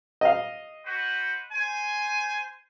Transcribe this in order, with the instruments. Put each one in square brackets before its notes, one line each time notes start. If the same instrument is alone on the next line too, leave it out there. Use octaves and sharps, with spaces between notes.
[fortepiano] D#5 F5
[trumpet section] F#4 B4 C5
C5 G#5